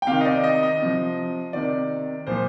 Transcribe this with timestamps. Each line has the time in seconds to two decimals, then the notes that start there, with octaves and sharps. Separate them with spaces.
0.02 G5
0.07 C3 D#3 F5
0.21 D#5
0.25 D5
0.44 D#5
0.63 D#5
0.81 C3 F3
1.53 C3 D#3 D5
2.27 A#2 F3 C5